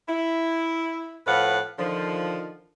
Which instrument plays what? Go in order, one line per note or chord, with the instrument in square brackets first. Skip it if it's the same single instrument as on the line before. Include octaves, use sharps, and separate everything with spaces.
[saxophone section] E4
A2 F3 B4 F5 F#5
D3 D#3 F3